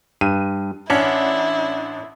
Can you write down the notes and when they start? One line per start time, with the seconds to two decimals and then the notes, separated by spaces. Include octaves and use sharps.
0.21 G2 D#7
0.90 A1 C#4 D4 E4 F#5